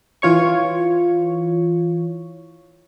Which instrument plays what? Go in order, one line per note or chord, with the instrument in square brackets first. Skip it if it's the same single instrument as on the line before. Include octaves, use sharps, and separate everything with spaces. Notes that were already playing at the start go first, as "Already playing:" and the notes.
[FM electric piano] E3 F4 C#5 C#6